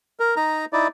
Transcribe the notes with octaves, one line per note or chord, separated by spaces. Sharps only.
A#4
D#4 A#5
D#4 E4 D5